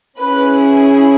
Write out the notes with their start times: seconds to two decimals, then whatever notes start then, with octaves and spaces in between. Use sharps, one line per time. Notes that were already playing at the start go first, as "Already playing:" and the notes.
0.19 C#4 E4 G#4 B4